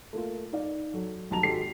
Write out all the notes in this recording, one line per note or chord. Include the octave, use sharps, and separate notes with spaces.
A3 A#3 F4
D#4 D5 F5
F#3 A4
D#1 B1 F#4 A5 A#5 F7
G#1 G#3 G4 A4 B6 C7